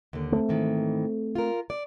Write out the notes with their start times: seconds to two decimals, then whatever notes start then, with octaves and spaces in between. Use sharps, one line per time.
0.13 D#2 D3
0.32 A3 A#3 C4
0.49 G#2 D#3 E3
1.35 F4 A#4
1.70 D5